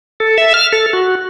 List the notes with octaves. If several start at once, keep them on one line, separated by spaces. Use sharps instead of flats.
A4
E5
F6
A4
F#4